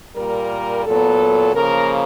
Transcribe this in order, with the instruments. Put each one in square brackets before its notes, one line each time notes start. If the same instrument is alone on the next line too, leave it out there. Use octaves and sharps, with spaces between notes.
[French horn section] A#2 G3 A#3 A#4
A#2 F#3 B3 A4
C#3 F3 A#3 A#4